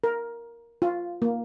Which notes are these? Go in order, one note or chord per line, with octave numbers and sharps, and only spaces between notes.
A#4
F4
A#3